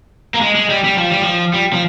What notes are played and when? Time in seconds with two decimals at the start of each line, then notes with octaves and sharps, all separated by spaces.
0.34 A#3
0.41 G#3
0.55 G#3
0.70 G3
0.84 G3
0.97 F3
1.10 G3
1.22 F3
1.54 G3
1.73 F3